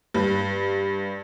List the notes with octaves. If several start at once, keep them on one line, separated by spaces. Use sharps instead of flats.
G2